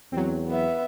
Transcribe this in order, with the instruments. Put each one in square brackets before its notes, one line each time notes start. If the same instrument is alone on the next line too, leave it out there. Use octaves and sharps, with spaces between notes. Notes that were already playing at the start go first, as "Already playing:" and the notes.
[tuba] E2 [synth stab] F#3 C4
[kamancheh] B3 E5